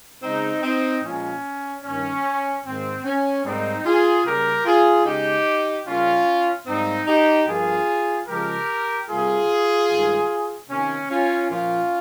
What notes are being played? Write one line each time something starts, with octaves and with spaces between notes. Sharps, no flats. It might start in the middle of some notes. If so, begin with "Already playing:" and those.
C#3 G#3 C4 D#4
C4 D#4
A#2 F3 G#3 C#4
G2 D#3 A#3 C#4
G#2 D#3 A#3 C4
C#4
G#2 G3 A#3 C4 D#4
F4 G#4
C#3 G3 A#3 G4 A#4
F4 G#4
C#3 G#3 D#4 G4
C#3 G3 A#3 C#4 F4
G#2 G3 A#3 C4 D#4
D#4 G4
G2 F3 A#3 F4 G#4
C#3 F3 G#3 G4 A#4
C3 G3 A#3 F4 G#4
G2 D#3 G#3
C3 D#3 A#3 C#4
C#4 F4
A#2 F3 A#3 C#4 F4